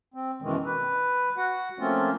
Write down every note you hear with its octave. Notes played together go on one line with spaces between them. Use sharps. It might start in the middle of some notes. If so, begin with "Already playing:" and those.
C4
F#2 B2 D#3 E3 G#3
B4
F#4 F#5
F3 A3 A#3 C4 C#4 F4